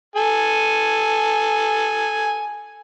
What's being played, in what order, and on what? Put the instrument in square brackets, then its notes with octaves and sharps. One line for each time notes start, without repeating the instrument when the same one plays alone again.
[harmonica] A4 G#5